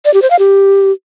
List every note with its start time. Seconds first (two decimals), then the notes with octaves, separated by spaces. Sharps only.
0.05 D5
0.14 G4
0.22 C5
0.31 F5
0.39 G4